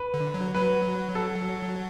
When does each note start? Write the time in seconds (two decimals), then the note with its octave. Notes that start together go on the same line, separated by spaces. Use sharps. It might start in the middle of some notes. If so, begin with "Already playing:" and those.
Already playing: B4
0.14 D3
0.34 F#3
0.55 F#3 B4
1.15 A4